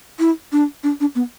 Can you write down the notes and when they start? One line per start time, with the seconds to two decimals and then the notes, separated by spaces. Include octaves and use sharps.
0.19 E4
0.52 D4
0.83 D4
1.00 D4
1.15 B3